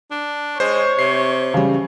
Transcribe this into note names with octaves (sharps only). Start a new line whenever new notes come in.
D4
G#3 C5 C#5
C3 C7
C#3 G3